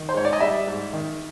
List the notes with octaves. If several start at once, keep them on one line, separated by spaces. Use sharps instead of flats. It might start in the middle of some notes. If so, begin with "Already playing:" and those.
Already playing: D#3
C5
G#2 C#5
D5
D#5
G3 D5 E5
G#2
D#3